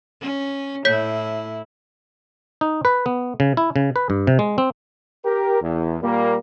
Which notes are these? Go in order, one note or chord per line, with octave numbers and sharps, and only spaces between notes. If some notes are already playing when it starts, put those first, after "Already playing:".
C#4
A2 E4 C#5 G6 B6
D#4
B4
B3
C#3
E4
C#3
B4
G2
C3
G#3
C4
G4 A#4
E2
A#2 G3 A#3